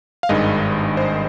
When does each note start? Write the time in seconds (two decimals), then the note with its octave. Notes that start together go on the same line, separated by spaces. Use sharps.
0.23 F5
0.29 G#1 G2 D#3 G#3 D#5
0.97 C5